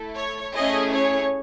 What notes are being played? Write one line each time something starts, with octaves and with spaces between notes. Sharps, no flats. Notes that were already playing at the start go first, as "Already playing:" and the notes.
Already playing: A3 E4 A4
C#5
A3 C#4 E4 G#4 D#5
C#5